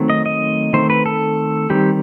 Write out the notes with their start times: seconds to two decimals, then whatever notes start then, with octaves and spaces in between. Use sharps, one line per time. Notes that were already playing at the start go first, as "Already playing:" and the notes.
Already playing: D#3 F#3 A3 C4
0.10 D#5
0.26 D#5
0.73 D#3 A3 C4 C5
0.90 B4
1.06 A4
1.70 D#3 G3 C4 G4